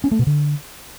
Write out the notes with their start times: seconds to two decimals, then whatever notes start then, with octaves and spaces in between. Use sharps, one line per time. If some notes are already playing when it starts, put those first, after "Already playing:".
0.04 C#4
0.11 A3
0.19 B2
0.27 D3